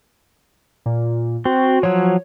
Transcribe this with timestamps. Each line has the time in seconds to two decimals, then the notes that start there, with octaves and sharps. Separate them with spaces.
0.86 A#2
1.45 C4 F#4
1.83 F3 F#3 C#5